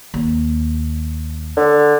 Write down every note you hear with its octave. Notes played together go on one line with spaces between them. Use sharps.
D#2
D3